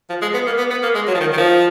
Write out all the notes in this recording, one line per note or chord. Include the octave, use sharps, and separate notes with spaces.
F3
G#3
B3
A#3
B3
B3
A#3
G#3
F#3
F3
D#3
D#3
F3